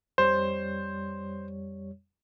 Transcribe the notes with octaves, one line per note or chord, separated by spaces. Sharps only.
F2 G3 C5 C#5